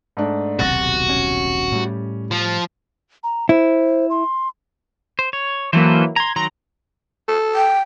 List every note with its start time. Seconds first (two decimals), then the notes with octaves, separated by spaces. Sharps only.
0.17 G#2 A3 D4
0.59 D#1 B1 C3 F#4 F#5 A6 A#6
1.09 C#4
1.72 A2 G3
2.31 F3
3.24 A#5
3.49 E4 C5
4.10 C6
5.19 C5
5.33 C#5
5.73 E3 F#3 A#3 A4 B4 C5
6.16 A#5 C6 G#6
6.36 D#3 F#3 A#5 C6
7.28 A4
7.55 G5